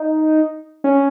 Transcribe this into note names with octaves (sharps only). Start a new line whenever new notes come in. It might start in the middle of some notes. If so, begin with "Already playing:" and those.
Already playing: D#4
C#4